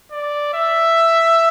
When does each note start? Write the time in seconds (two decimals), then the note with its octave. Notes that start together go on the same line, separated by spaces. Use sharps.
0.12 D5
0.54 E5